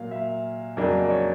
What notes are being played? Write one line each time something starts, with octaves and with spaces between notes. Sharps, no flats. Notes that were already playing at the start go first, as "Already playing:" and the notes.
Already playing: A#2 F#3 A#3 F5
E5
F2 C#3 F#3 A#3 D4 D#5
D5
C#5